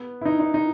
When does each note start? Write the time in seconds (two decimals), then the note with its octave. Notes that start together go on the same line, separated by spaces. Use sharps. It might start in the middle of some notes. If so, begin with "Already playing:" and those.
Already playing: B3
0.21 E4
0.25 D#4
0.39 D#4
0.54 D#4